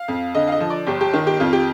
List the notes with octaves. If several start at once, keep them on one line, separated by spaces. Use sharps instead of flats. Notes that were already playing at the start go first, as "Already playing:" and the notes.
Already playing: F5
F2
D3 D#5
F5
D#5
F3
D5
G1 G4
G4
D#3
G4
F2 F4
G4